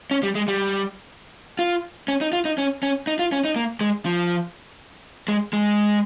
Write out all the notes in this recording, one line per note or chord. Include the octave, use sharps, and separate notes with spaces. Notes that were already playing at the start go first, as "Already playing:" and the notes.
C#4
G3
G#3
G3
F4
C#4
D#4
F4
D#4
C#4
C#4
D#4
F4
C#4
D#4
A#3
G#3
F3
G#3
G#3